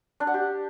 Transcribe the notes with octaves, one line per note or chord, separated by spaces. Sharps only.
D4
F#5
G4